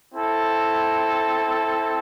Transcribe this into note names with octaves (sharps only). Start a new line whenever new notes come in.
C4 E4 A4